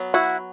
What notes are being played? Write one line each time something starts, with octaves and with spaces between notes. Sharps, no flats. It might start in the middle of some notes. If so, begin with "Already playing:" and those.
Already playing: F#3 B3
E4 F#4